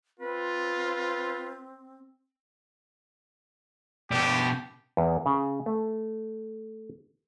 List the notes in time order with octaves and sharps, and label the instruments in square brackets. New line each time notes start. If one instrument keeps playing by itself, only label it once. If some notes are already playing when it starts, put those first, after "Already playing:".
[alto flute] C4 [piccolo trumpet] F4 [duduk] B4
[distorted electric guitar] B2 D4 [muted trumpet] G4
[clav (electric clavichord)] E2
C#3
A3